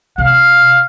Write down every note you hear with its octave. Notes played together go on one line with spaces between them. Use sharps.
C3 F5